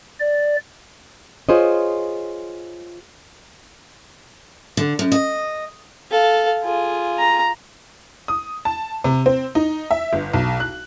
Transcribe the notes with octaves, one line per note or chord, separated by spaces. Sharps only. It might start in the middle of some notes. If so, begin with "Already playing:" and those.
D5
F4 G#4 C5 C#5 D#5
D3
F#2
D#5
A4 F5
F4 G#4
A#5
D#6
A5
C3
C4
D#4
E5
G1
B1
F#6